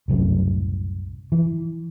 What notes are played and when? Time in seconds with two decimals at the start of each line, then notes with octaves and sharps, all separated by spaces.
0.08 F#1 C2 F#2 A2
1.32 E3